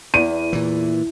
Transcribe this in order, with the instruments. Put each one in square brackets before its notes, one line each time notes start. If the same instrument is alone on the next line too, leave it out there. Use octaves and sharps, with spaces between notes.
[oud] E2 [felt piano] D#7
[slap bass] A#2 E3